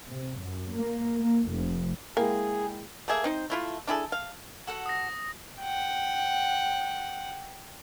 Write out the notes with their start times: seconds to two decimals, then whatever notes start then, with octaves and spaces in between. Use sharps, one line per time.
0.11 C3
0.41 F#2
0.73 A#3
1.18 A#3
1.50 F1
2.17 G#3 A#3 E4 G#4 G5
3.08 A3 A#3 G#4 E5
3.24 C4 D#4 C5
3.50 A3 E4 F4
3.87 D4 E4 G#4 A4
4.12 F5
4.67 F#4 A4 F#5
4.86 D#6 A#6
5.61 F#5 G5